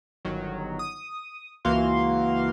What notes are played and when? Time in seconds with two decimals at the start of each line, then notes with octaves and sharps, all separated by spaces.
0.25 G1 D#3 F#3
0.79 D#6
1.65 C#2 E3 A#3 F#4 F5 C6